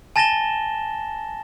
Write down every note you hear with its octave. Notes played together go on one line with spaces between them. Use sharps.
G#5 A5 A6 A#6 E7 G7